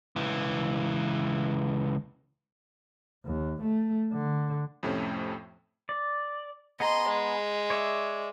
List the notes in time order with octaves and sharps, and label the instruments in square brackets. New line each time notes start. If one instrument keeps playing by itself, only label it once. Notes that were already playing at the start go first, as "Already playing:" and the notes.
[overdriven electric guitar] C#2 E3
[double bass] D#2
A3
D3
[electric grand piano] F2 A2 C3 A3 C#4
[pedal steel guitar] D5
[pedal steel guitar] B3 G#4 A#5 [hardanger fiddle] D#5 C6
[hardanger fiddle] G#3
[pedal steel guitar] C#5 D5 E5